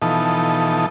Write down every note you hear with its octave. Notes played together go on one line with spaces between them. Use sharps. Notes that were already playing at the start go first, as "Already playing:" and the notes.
B2 E3 F3 D#4 A4